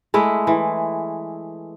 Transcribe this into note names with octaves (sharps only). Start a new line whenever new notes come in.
G#3 A3 E4
E3